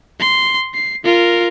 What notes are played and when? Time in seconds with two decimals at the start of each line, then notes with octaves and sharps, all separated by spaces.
0.20 C6
0.74 C7
1.05 F4 A#4